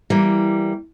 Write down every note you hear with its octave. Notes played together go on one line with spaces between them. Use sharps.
E3 G3 A#3